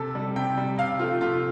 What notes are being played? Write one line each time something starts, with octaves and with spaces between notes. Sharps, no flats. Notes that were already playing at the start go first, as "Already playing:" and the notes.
Already playing: C3 A4
G3
C3 G5
G3
C3 F5
F3 A3 F4
C3 F4